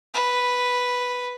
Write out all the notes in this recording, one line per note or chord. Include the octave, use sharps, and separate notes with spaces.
B4